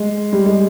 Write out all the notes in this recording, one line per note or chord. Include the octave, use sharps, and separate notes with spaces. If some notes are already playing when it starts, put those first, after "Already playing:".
Already playing: G#3
G3
G#3